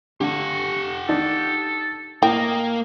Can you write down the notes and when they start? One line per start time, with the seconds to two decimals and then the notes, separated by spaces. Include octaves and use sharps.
0.21 D3 G4 F#5 C#6
1.09 D#3 D4 D#4 A4
2.23 A2 A#3 D#5 G5